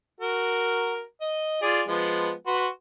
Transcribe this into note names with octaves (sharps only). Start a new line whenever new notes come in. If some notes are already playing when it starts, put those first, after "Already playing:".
F#4 A#4
D#5
F4 G#4 D5
F3 G#3 B3
F#4 B4 C6